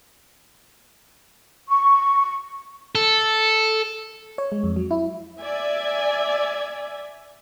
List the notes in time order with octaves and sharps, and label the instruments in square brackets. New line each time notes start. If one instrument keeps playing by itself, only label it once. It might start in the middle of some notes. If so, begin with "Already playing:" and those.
[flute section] C#6
[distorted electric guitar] A4
[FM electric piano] C#5
G#3
F2
F#3
E4
[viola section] D5 E5 G#5